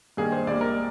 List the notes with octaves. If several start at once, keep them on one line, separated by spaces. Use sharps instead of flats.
G2 D#3 G3 A#3 G#4
C5
A#1 G#2 G3 A#3 D5
A#4